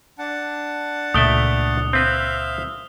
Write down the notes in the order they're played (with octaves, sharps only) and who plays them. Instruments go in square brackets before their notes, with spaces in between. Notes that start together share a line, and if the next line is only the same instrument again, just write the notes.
[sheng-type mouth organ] D4 F#5 A5
[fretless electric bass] C#2 A#2 [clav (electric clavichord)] A3 D5 E5 [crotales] D#6 G7
[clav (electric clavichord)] C4 B4 [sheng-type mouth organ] E5 F5